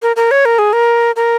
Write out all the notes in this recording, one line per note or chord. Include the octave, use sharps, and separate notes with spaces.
A#4
A#4
C#5
A#4
G#4
A#4
A#4